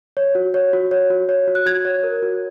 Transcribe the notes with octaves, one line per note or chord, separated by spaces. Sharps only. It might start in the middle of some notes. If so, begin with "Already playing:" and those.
C#5
F#4
C#5
F#4
C#5
F#4
C#5
F#4
F#6
F#4 G#6
C#5
A#4
F#4